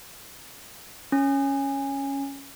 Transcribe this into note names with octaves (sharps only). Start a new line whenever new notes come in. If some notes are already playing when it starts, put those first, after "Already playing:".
C#4